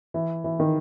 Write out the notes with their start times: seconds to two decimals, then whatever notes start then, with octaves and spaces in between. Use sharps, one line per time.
0.14 E3
0.44 E3
0.60 D#3